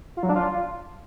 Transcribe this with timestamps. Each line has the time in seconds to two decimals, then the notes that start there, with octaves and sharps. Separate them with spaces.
0.17 F4
0.23 F#3
0.29 D4
0.36 F4